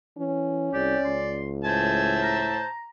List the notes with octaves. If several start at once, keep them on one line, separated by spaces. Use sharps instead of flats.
E3 C#4
C2 G4 D5
C#2 C6
A2 C5 E5 G#5 A5
A#5